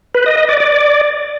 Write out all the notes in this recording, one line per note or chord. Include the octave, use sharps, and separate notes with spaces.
B4
D#5
D#5
D5
D5